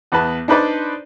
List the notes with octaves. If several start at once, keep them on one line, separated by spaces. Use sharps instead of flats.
E2 B3 B4 A5
D4 D#4 B4 C5 D5